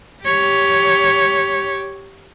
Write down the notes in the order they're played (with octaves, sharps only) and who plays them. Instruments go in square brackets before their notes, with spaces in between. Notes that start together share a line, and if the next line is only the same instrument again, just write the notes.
[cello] G4 C#5